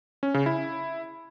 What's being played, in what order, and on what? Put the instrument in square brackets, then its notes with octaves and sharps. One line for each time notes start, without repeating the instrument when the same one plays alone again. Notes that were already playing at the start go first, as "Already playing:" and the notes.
[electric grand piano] C#4
C#3
E4